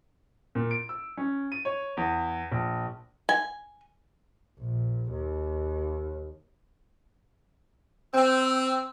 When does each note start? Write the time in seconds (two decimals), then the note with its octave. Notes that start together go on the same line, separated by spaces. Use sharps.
0.55 A#2
0.71 D7
0.89 E6
1.17 C#4
1.52 D#7
1.65 C#5
1.97 E2
2.51 A#1
3.29 G#5
4.59 A#1
5.11 D#2
8.14 C4 E6